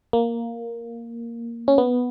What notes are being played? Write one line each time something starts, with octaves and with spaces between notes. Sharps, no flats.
A#3
C#4
B3